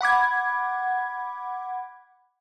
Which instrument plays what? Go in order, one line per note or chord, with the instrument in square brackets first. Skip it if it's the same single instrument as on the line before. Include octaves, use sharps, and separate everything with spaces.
[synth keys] F#5 B5 D6 G#6